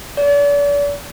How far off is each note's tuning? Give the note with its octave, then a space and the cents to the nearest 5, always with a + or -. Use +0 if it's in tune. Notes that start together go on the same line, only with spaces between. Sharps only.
D5 -40